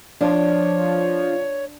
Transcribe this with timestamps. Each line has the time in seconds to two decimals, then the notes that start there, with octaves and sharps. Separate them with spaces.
0.21 F3 D4 C#5